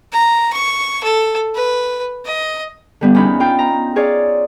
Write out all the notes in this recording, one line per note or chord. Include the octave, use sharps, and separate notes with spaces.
A#5
C#6
A4
B4
D#5
D3 G3 B3
E2 C#4 D#4 B5
D#4 F4 G5
A#5
F4 G#4 C#5 D5